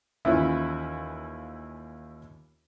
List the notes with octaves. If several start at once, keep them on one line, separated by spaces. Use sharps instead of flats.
D#2 E3 C#4 E4 F4 E5